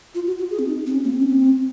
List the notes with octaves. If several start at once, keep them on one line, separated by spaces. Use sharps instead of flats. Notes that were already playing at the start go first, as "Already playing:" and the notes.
F4
F#4
F#4
G#4
C4
D#4
C4
C#4
A#3
C4
C#4
C4